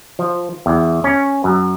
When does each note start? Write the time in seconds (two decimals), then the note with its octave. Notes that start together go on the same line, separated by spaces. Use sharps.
0.19 F3
0.66 E2
1.04 C#4
1.44 F#2